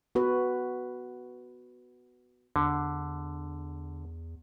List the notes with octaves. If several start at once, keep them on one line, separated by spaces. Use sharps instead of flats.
B3 F#4 B4
E2 D3